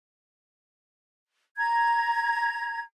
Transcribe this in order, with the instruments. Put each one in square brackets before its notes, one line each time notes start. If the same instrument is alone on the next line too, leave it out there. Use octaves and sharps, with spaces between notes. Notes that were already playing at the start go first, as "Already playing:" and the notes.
[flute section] A#5 G#6